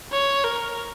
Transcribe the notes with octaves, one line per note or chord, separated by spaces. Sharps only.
C#5
A#4